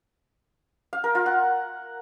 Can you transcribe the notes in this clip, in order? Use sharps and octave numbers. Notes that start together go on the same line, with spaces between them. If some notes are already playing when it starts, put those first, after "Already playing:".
F5
A#4
F4
F#5